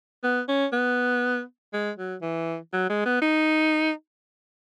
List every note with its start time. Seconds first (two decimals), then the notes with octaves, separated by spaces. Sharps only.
0.23 B3
0.48 C#4
0.73 B3
1.73 G#3
1.98 F#3
2.22 E3
2.73 F#3
2.90 G#3
3.06 B3
3.22 D#4